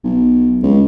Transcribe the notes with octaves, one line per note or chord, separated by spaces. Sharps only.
B1
C#2